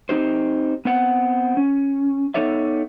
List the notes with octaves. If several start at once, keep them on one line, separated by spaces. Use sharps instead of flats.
C4 D#4 G4 C5
B3 C4 F#5
C#4
B3 D#4 A4 C#5 D5 E5